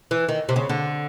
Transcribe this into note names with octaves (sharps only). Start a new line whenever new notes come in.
E3
D#3
C3
C#3
D3